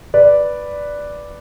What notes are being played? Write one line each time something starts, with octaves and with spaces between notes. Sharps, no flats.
B4 D5